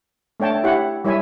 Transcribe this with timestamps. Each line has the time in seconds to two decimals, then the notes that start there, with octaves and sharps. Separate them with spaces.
0.40 A3 D4 C#5 G5 A5
0.64 E4 G4 C#5 F#5
1.04 G3 E4 C#5 E5 G#5